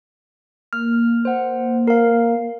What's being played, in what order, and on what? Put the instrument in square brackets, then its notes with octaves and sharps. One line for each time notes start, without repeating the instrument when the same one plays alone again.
[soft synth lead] A#3 [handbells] F6
[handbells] C5 F#5
A#4 F5